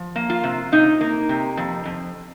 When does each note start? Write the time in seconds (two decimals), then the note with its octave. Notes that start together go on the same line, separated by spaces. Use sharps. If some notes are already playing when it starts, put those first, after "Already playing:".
Already playing: F3
0.16 A#3
0.30 F4
0.43 C3
0.72 C3 D#4
1.01 A#3
1.29 C3
1.57 F2
1.85 F2